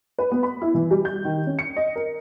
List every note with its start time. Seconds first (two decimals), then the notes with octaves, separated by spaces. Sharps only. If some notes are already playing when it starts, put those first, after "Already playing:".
0.19 B4
0.32 B3
0.43 B5
0.62 E4
0.75 E3
0.91 G3
1.05 G6
1.25 D#3
1.47 C#4
1.59 C#7
1.76 D#5
1.96 A#4